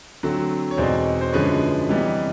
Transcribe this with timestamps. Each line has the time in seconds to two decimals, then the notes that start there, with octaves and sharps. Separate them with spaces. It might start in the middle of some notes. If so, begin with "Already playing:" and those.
0.23 D3 F#3 A3 C4
0.71 C#5
0.78 E2 B2 G#3 C4 D#4 C5 D5
1.21 C5
1.33 F#2 D3 F3 G#3 B4 C#5
1.88 C3 E3 G3 B3 D#4